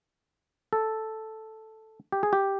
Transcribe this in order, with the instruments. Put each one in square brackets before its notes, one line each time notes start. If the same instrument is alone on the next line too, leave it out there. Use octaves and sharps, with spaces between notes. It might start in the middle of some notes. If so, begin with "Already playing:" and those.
[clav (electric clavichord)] A4
G4
G#4
G4